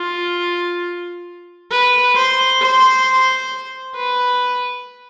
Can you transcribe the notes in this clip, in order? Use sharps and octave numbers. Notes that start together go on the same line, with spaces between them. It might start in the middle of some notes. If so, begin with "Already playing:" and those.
Already playing: F4
B4
C5
C5
B4